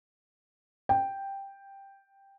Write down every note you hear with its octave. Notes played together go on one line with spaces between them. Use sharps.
G5